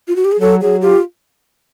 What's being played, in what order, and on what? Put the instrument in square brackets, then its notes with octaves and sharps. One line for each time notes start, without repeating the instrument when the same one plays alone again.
[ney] F4
F#4
G4
G#4
[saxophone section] F#3 [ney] A4
[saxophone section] F#3 [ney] G#4
[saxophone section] F4 [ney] G4